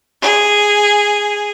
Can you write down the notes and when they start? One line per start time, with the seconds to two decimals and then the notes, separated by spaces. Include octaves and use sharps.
0.22 G#4